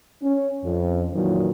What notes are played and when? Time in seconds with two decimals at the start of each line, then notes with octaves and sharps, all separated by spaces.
0.22 C#4
0.64 F2
1.13 A#2 D#3 E3 F#3